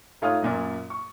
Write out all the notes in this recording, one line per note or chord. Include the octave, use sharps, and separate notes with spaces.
G#2 A3 F4 C#5 D#6 F6
F#2 A#2 D5
C#6